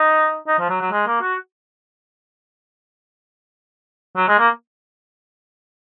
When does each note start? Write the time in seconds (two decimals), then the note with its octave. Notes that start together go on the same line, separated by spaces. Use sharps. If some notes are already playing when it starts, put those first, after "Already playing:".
Already playing: D#4
0.47 D#4
0.59 F3
0.70 F#3
0.81 F#3
0.91 G#3
1.07 A#3
1.21 F#4
4.16 F#3
4.28 G#3
4.39 A#3